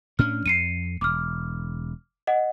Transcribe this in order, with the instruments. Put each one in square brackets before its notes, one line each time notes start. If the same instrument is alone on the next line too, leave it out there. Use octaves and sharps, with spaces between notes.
[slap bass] A2 C#4 D4 [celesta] F6
[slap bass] F2 [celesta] C7 C#7 D#7
[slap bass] E1 [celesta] D6 F6
[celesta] D#5 F#5